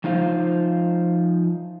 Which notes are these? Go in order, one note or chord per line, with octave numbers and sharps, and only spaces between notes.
F3 D#4 F4 C5 F5